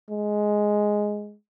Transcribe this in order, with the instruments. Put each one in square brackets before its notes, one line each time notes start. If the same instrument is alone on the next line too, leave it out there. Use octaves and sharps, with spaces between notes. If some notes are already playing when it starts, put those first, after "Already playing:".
[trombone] G#3